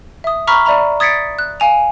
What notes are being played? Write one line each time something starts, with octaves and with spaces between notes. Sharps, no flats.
E5 D#6
A#5 B5 C#6 F6 B6
D5 E5 A#5 B5
D#6 G#6 A6 B6 C#7 D7
F#6
F5 G#5 F7